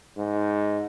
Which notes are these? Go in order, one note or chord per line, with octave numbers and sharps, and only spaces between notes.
G#2